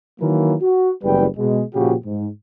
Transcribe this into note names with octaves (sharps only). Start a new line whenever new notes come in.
D#3 E3 F#3 A#3 A#4
F#4
F#1 E2 G3 B4 G5
B2 G#3
A#2 C#3 F3 F#4 G4
G#2